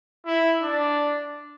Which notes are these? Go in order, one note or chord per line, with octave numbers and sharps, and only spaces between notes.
E4
D4